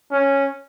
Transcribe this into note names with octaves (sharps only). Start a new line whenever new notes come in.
C#4